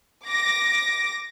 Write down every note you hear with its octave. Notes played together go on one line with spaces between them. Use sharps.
D6 A#6